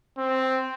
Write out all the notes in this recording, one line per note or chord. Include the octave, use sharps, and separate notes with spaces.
C4